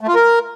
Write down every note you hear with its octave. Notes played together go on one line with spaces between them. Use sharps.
A3
F4
A#4